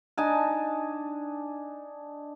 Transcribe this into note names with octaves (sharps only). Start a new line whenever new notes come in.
D4 D#4 G#5 A5